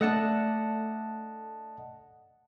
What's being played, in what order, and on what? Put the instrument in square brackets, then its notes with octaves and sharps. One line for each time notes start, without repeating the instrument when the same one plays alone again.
[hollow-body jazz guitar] A3 D4 [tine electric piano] D#5 F#5 A5